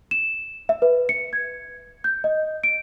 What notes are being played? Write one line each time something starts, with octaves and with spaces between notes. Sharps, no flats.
E7
E5
B4
C#7
G#6
G6
D#5
D7